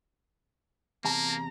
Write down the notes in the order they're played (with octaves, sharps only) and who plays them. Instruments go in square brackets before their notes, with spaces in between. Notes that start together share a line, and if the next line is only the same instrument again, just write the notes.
[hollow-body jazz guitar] E2 C3 A5 [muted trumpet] A#3 [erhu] A#5